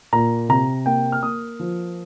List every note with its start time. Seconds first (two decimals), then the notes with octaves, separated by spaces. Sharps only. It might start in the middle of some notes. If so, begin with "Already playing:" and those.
0.13 A#2 A#5
0.49 C3 A#5
0.86 A#3 G5
1.12 F6
1.23 A#3 D#6
1.60 F3